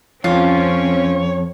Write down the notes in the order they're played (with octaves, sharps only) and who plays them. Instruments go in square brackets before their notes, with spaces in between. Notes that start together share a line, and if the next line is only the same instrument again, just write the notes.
[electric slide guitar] F2 [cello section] C4 C#4 [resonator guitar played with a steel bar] F4 [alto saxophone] C#5